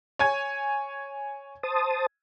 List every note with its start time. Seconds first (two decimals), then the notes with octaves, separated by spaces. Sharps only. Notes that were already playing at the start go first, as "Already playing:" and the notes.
0.19 C#5 G#5 G#6
1.63 C5 A5 D#6